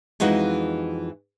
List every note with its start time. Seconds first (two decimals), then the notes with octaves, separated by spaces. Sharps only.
0.20 F2 E3 G#3 D#4 F#4